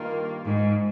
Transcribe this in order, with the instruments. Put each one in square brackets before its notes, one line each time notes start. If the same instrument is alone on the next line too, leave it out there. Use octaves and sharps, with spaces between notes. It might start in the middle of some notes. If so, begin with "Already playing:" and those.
Already playing: [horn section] G2 D#3 A#3 F4
[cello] G#2